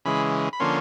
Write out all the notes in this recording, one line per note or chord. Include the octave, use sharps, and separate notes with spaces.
C#3 E3 G#3 B5
B5
D3 F3 A#3 C#4 C6